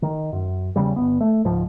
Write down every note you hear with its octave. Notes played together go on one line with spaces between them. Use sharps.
D#3
F#2
E2 C#3 G3
G1 D#2 B3
A3
C#2 G#2 F3